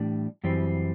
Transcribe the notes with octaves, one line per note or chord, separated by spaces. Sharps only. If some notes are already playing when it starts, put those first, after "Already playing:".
Already playing: A2 E3 G3 D4
F#2 E3 G3 C4